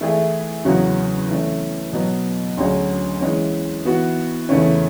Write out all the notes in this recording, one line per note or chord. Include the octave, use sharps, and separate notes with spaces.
E3 A3 E4 G#4
E2 C#3 F#3 C#4 F#4
E3 A3 C#4
B2 F#3 B3
D2 D3 F#3 C#4 G#4
E3 G#3 C#4
E3 B3 F#4
E2 C#3 E3 A3 C#4